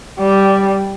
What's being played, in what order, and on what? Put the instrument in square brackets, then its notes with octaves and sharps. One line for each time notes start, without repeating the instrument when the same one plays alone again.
[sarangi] G3